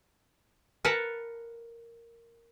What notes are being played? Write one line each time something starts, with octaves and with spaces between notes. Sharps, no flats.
A#4 B4 F#5 A5 A#5